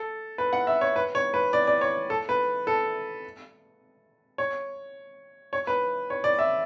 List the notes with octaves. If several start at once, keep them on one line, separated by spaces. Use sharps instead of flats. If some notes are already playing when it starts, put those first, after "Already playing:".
Already playing: A4
B4
F#5
E5
C#5
B4
C#5
B4
D5
D5
C#5
A4
B4
A4
C#5
C#5
B4
C#5
D5
E5